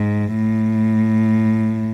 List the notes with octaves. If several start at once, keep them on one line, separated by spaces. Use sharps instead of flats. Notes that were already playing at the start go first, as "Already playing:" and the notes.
Already playing: G#2
A2